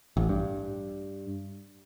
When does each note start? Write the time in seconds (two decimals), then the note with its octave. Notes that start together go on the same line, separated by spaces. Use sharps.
0.17 A1
0.29 G2